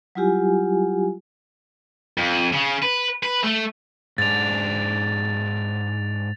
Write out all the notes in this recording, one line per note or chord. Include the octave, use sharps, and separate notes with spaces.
F#3 G3 E4 F4 G4 G#5
F2
C#3
B4
B4
A3
G#2 D4 A6 F7